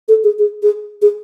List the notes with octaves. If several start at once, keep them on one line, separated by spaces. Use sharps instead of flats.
A4
G#4
G#4
G#4
G#4